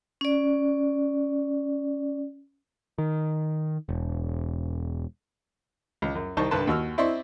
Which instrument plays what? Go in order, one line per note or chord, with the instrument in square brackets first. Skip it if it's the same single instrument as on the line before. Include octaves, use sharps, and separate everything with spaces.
[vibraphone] C#4 D5
[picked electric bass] D#3
E1
[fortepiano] C#2
F#2
C2 D#4 C5 A5 C#6
C2 G2 D3 B4 A5 C6
D#2 F#4 E6 F6
C4 E4 D5 D#5 C6 C#6